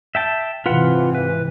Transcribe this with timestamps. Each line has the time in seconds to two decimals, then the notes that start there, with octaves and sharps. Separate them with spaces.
0.15 E5 G5 A5
0.66 G#2 C3 E3 F4 B4 F#5
1.15 B4